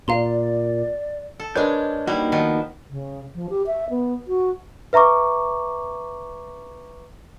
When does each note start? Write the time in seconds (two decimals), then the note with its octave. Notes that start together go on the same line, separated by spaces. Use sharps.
0.08 A#2 D5 F5 A#5 C6
1.40 A4
1.55 G#3 D4 A#4 B4 C#5 G6
2.07 G3 A#3 D#4 E4 F#4
2.32 D#3 F3 B3
2.90 C#3
3.35 F3
3.50 G4
3.67 E5
3.90 B3
4.28 F#4
4.93 B4 E5 A#5 C#6 D6